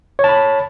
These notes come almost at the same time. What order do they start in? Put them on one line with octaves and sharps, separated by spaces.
C#5 A5 B5